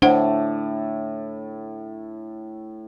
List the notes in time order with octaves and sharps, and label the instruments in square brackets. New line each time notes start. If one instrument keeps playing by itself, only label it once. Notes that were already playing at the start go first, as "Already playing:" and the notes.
[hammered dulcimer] A2 A3 [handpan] D4 [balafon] C5 F#5